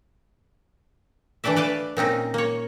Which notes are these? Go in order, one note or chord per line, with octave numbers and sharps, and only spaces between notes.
E3 A3 D4 D5 E5
B4 D5 F5 A5
A#2 C4 C#4 D#4
A#3 C#5